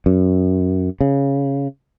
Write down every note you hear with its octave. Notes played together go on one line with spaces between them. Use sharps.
F#2
C#3